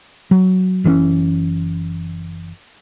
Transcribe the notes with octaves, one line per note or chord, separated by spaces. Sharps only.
F#3
F#1 E3 C4 C#4